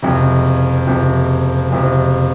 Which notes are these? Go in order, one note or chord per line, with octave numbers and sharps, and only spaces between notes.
F#1 F2 C3
F#1 F2 C3
F#1 F2 C3